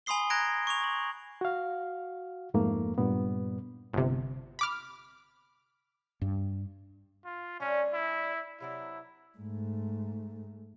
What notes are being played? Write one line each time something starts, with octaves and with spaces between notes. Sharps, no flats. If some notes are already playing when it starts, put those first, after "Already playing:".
G#5 B5 C6 D#6 C7 G7
A#5 F#6 G#6 A#6 D7
C#6 D6 F7
F#7
F#4 F5
F2 G#2 A3 A#3
G2 A#2 B3
G1 C3
B5 D6 F6
G2
F4
G3 A3 C#4 D4
E4
C3 F#3 D4 E4
G#2 A3